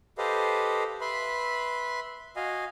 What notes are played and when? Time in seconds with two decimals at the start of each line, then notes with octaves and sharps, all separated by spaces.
0.18 G4 A4 B4 C5 D#5 F5
1.01 B4 E5 B5 C6
2.36 F#4 D#5 F5 G#5